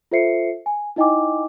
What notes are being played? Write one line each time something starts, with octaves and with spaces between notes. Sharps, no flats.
F4 A4 C5 E5 C7 C#7
G#5
D#4 E4 D#5 G5 G#5 D6